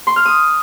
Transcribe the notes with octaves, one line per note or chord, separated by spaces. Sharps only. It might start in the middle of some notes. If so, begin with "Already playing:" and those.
C6
F6
D#6